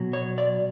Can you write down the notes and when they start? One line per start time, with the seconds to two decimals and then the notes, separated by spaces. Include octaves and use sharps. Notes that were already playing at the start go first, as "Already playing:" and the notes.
Already playing: B2 F#3
0.13 C#5
0.38 D5